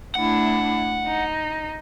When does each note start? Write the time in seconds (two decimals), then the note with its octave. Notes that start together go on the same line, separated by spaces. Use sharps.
0.15 A3 D4 E4 F#5
1.07 D#4